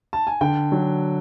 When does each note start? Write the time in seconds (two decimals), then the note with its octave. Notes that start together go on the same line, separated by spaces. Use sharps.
0.13 A5
0.27 G#5
0.41 D3 G5
0.72 F#3